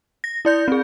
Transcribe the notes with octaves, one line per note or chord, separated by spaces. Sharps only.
A#6
E4 D5 G6
C4 G#4